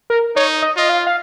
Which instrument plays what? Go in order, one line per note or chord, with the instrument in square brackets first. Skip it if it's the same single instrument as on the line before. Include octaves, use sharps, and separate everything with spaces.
[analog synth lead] A#4
[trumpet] D#4 [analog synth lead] C#5
[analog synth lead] D#5
[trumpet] F4 [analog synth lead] D#5
[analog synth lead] F5
F5